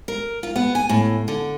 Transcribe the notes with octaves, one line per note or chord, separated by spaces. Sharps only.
A#4
F4
B3
G#5
A2
D3